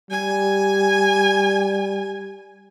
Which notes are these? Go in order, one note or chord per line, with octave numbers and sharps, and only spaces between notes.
G3 G#5